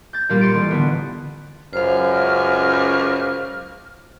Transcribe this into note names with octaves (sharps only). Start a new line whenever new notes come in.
G6 A6
A#2 G3 A#3 F4 G4
C6 A6 C#7 D7
A1
D3 B3
C#2 F#2 C5 F5 F6